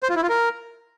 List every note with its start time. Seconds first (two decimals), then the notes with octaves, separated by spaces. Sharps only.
0.03 C5
0.09 F4
0.16 E4
0.23 F4
0.29 A#4